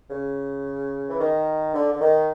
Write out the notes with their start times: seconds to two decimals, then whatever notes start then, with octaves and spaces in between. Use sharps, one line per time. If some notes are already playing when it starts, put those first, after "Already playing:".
0.10 C#3
1.08 E3
1.19 D#3
1.74 D3
1.92 D3
2.01 D#3